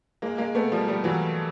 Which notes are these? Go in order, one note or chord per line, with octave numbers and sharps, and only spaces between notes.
G#3 A#3
G#3 A#3
A3 B3
F3 G3
F3 G3
E3 F#3